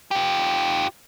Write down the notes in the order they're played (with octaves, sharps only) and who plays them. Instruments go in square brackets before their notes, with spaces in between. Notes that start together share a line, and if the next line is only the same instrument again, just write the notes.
[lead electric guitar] F4 G4